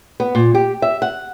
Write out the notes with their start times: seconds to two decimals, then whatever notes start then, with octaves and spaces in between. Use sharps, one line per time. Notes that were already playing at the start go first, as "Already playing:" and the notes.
0.20 B3
0.35 A#2
0.55 G4
0.82 E5
1.02 F#5